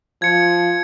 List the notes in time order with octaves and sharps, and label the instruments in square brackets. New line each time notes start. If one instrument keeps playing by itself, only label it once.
[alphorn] F3 [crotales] G#6 C#7